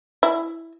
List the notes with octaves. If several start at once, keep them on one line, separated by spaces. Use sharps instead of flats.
E4